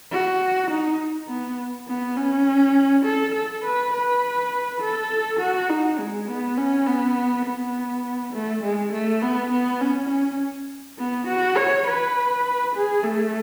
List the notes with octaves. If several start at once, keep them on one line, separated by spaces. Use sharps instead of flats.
F#4
D#4
B3
B3
C#4
A4
A4
B4
B4
A4
F#4
D#4
G#3
B3
C#4
B3
B3
A3
G#3
A3
B3
B3
C#4
C#4
B3
F#4
C#5
B4
G#4
A3